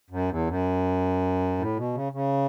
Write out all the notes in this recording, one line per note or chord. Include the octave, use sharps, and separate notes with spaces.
F#2
E2
F#2
A2
B2
C#3
C#3